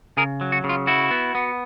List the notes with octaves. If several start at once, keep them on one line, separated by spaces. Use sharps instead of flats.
C#3 G#4 A#4
F#3
F#4
C#3
F4
E4 F#4
B3
B3